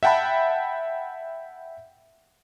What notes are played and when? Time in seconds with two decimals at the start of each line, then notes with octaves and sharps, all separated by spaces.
0.03 E5 F#5 G5 A5 B5